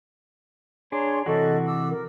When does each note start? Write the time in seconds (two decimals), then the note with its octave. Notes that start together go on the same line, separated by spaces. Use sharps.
0.92 D4 G#4 C#5 A#5 C6
1.26 C3 E3 F#4 A4 D#5 C#6
1.66 D6 E6
1.89 A#4